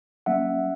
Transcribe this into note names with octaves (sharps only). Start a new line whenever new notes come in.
F#3 A#3 C#4 E5 F#5